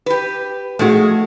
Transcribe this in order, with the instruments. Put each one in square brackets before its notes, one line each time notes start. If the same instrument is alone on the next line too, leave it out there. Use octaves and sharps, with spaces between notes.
[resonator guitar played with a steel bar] G4 B4
[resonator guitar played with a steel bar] F3 G#3 G#4 [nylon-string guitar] A3 F#4